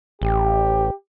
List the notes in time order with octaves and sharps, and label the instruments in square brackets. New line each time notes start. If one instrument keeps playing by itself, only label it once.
[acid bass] A1 [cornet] G4